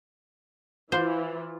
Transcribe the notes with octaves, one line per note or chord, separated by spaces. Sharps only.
E3 F4 C5 D5